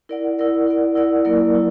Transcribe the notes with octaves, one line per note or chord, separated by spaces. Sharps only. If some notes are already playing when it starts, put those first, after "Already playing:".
E4 A#4 D5 F#5
E4 A#4 D5 F#5
E4 A#4 D5 F#5
E4 A#4 D5 F#5
F#3 A#3 E4 A#4 D5
F#3 E4